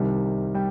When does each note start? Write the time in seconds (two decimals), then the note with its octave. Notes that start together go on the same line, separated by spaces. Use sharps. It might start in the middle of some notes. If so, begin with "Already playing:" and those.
Already playing: C2 C3 D#3 G3
0.54 G3 G5